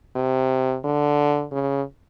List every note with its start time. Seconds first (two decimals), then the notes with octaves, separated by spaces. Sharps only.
0.16 C3
0.84 D3
1.52 C#3